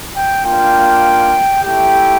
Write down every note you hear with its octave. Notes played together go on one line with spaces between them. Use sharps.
G5
A#3 D4 F4 G5
A3 E4 G4 G5